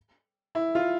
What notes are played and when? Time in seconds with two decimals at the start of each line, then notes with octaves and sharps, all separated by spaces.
0.55 E4
0.75 F4